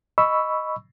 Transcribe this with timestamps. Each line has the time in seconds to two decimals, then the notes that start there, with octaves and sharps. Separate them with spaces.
0.18 D#5 B5 C#6 E6